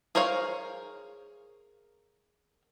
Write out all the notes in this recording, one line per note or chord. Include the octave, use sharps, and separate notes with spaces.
G#4 A#4 C5 C#5 F5